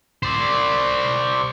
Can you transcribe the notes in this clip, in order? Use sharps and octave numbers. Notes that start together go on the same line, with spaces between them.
C5 D5